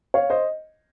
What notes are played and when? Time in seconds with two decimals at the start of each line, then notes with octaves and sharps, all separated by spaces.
0.14 C#5 F5
0.30 C5 D#5